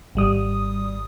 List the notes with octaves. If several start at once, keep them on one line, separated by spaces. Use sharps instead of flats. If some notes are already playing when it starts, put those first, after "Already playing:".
G#1 G3 D#6